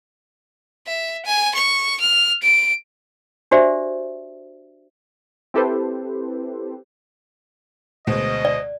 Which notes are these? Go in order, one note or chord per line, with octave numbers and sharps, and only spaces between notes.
E5
G#5
C#6
F6
D7
D4 F#4 G4 C5 D5 E5
C4 E4 G4 A4 B4 C5
D2 B2 G#3 C5 D#5
D5